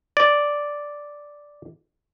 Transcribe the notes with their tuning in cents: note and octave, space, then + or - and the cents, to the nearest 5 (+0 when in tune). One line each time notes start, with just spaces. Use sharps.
D5 -5